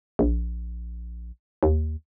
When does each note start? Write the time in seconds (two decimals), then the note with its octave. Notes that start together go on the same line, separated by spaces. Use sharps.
0.19 A#1
1.63 D#2